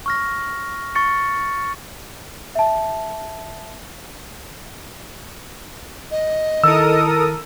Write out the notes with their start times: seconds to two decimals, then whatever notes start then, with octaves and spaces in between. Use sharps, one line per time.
0.06 C#6 F6 A#6
0.95 C#6 A6 C#7
2.55 E5 A5
6.11 D#5
6.64 D#3 E4 A4 A#4 D#6 E6